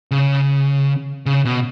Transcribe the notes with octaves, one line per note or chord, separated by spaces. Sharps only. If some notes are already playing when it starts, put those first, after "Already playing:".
C#3
C#3
B2